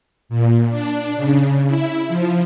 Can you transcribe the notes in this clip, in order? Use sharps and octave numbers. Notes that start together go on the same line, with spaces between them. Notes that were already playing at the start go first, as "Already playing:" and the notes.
A#2
D4
C#3
E4
F3